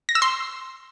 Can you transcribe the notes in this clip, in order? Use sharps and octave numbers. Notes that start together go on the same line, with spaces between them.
A#6
E6
C6